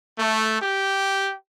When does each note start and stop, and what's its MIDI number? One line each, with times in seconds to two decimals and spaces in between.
0.19 0.61 57
0.62 1.34 67